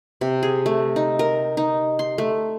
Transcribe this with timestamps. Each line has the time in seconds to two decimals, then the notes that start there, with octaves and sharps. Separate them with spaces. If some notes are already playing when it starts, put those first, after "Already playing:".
0.21 C3
0.43 G#4
0.66 A3
0.96 D#4
1.19 A#4
1.57 D#4
1.99 C6
2.18 A3